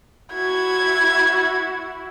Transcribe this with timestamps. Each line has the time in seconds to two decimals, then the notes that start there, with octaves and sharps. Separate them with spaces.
0.34 E4 F#4 G#6